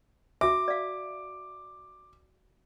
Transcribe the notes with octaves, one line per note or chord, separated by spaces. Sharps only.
F#4 E5 D6
D5 F5